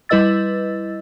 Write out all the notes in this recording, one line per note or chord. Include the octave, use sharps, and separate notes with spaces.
G3 E4 B4 D#5 E6 A6